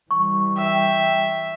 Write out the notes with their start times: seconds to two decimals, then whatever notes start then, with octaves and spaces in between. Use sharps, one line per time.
0.11 E3 G3 C#6
0.57 E5 G5